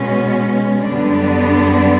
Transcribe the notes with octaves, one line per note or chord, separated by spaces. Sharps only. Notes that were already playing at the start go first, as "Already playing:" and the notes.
Already playing: B2 G#3 C#4
F#2 D3 G3 B3 D4